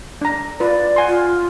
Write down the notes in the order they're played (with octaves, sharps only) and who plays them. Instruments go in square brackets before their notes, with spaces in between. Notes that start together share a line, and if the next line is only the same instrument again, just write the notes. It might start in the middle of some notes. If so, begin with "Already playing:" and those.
[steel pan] D4 A#5
[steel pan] F4 B4 [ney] D5
[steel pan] F#5 G#5 C6
[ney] F4